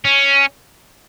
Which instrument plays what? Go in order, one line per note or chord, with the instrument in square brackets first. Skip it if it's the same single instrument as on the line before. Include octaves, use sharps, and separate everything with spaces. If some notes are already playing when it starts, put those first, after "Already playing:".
[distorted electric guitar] C#4